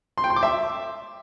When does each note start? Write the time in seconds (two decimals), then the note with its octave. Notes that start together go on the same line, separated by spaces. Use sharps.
0.18 C6
0.24 G5
0.30 C6
0.36 D6
0.43 E5